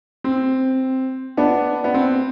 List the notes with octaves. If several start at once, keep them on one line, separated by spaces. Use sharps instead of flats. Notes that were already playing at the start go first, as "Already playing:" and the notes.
C4
B3 D4
B3
C4